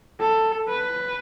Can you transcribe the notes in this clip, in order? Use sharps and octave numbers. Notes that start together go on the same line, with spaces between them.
A4
B4